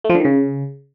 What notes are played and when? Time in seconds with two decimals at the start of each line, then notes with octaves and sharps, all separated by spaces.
0.04 A3
0.10 F3
0.15 D3
0.20 D#3
0.25 C#3